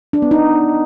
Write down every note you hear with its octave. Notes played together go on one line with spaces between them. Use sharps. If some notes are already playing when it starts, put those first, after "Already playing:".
D4
B3
D#4